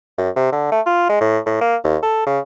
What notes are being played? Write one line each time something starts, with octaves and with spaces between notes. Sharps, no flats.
F#2
C3
D3
A3
F4
G#3
A2
A2
A#3
D#2
A4
C#3